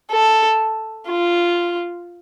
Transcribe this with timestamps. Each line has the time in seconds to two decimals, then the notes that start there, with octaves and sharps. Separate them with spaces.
0.11 A4
1.08 F4